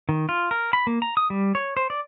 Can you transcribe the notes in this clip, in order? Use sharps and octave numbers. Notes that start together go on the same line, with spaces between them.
D#3
F4
A#4
B5
A#3
A#5
D#6
G3
C#5
C5
D5